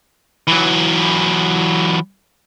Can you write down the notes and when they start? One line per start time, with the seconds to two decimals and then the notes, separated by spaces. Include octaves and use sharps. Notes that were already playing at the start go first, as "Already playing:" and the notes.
0.47 E3 F#3